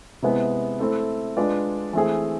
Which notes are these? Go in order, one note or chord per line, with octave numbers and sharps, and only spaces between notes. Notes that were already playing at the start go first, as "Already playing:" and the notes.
C3 G#3 B3 E4 B4
A3 C4 E4 A4
G#3 D4 F4 B4 D5
E3 A3 C4 G#4